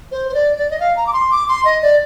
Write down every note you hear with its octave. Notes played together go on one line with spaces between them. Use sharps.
C5
C5
D5
D5
D#5
F5
A#5
D6
C6
D6
C6
D#5
D5